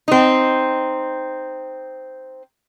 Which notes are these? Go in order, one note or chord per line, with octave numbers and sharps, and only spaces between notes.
C4 D#4